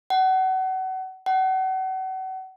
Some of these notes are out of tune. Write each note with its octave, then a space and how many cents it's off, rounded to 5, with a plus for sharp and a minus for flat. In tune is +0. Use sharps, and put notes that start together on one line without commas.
F#5 +30
F#5 +35